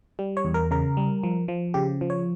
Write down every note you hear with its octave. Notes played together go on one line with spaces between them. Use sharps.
G3
C#5
E2
A#4
C#3 A#4
G3
F3
F3
C#3 G4
F3
C#5